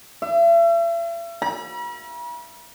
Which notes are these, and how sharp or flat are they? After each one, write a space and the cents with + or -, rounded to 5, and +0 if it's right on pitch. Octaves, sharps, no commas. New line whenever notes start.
E5 +40
B5 -45